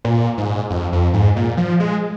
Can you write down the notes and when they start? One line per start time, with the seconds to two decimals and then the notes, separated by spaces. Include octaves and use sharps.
0.05 A#2
0.38 G#2
0.70 F2
0.93 F2
1.14 G#2
1.36 A#2
1.57 F3
1.80 G#3